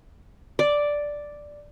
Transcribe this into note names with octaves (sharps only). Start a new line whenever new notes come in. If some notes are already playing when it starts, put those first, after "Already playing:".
D5